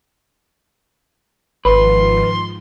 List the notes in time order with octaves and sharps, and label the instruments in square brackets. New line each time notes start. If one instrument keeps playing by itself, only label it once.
[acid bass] G#1 [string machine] G#2 D#3 F3 [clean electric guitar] B4 [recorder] C6